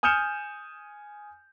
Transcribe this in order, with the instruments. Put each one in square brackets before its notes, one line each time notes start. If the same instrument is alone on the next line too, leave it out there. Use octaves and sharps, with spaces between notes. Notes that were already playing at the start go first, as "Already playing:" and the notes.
[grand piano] G#5 D#6 F6 G6 C#7 E7